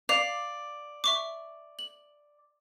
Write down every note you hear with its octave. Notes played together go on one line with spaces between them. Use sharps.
D5 F5 C7 F7
E5 C#6 D6
F#7